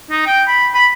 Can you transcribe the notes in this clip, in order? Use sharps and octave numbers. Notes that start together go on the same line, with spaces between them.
D#4
G5
B5
B5